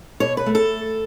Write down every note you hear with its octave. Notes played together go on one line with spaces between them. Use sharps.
B2 C#5
B4
A3
A4